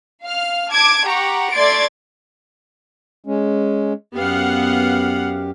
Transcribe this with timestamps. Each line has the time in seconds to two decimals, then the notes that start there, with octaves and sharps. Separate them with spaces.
0.24 F5 F6
0.70 A5 D6 G#6 D7
1.07 G4 F#5 A#5 C#6
1.53 A3 D5 C6 G#6 A6 D7
3.26 G#3 C#4
4.14 F#2 B3 G4 F5 F#5